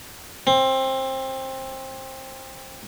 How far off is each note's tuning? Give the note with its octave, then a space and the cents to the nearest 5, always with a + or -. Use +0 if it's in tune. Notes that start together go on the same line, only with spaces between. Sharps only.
C4 +20